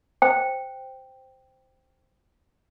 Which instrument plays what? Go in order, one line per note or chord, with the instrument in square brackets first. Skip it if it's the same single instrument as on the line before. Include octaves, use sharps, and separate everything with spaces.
[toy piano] C5 G5